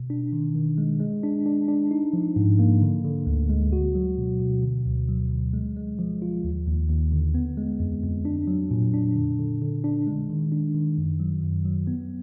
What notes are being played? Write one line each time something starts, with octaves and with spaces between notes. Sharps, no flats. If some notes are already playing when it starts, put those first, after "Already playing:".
Already playing: B2
D4
D#3
D#3
G#3
G#3
D4
D4
D4
D#4
F3
G#2
A#3
D3
D3
D2
G#3
F#4
F#3
B2
B2
D3
D2
F#3
D3
G#3
G#3
F3
F4
D#2
D#2
D#2
D3
B3
G#3
F2
F2
D4
F#3
A#2
D4
D3
D3
D3
D4
G#3
D#3
D4
D#3
F#2
F#3
F#2
F#3
B3